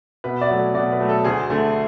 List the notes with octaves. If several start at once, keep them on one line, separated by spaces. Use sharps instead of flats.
B2 B4
D5
F#3 A3
C#5
B2 D5
B4
F#3 A3
A4
D2 G#4
D3 A3